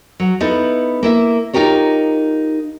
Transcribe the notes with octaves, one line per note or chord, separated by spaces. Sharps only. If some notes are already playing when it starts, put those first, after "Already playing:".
F#3
B3 D#4 E4 A4
A#3 E4 E5
D#4 F4 G4 A#4 C#5